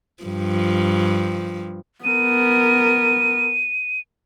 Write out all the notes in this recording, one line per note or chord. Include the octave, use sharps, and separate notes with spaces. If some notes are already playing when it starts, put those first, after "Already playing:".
G2 F3
B3 A#4 D#7